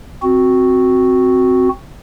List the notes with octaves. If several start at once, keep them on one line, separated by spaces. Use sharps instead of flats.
C4 F#4